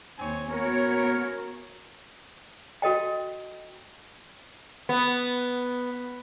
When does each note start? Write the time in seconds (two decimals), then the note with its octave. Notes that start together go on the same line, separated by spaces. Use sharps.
0.18 D#2 C4 C#5 G#5
0.50 B3 C#4 F#4 A#4 C#5
2.82 F#4 A4 D#5 G5
4.89 B3